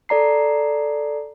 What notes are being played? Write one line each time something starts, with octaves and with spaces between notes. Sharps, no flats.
A4 D5 A#5 C7